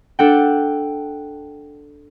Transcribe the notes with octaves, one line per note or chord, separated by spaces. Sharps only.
D4 A4 F#5 G5